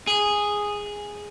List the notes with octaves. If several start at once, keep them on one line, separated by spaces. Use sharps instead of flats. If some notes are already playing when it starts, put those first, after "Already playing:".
G#4